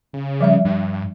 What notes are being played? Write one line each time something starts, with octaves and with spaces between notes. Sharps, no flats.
C#3
F3 G3 E5
G2